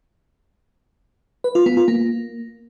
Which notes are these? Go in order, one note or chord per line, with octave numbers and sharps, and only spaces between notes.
B4
F4
B3
F4
A#3